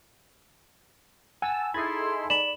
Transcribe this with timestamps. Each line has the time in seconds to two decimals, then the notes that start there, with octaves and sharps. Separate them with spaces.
1.42 F#5 G#5 A5 E6
1.74 D#4 E4 G#4 A4 B5 C6 G#6 A6
2.30 D5 B5 E7 F#7